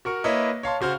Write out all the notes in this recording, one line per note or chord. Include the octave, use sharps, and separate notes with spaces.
F#4 A#4 C#6
A#3 E4 B4 C#5 D#5
C#5 F5 A5 C6
C#3 F#4 C5 F6